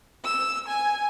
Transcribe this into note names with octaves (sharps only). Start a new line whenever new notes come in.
E6
G#5